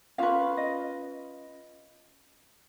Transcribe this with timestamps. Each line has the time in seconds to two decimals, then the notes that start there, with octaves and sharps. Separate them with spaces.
0.18 C#4 F4 B4 F5
0.57 D#5